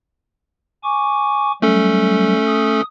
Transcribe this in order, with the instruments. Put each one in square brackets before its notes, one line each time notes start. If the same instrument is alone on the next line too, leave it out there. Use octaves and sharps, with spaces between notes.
[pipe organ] G#5 C#6 D6
[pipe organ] F#3 G3 [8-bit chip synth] A3 C#4 A4
[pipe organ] D#6